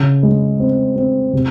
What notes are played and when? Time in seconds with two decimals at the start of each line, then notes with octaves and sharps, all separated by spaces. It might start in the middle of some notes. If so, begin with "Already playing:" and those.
Already playing: C#3
0.23 G#3
0.60 C4
0.96 C4
1.33 C3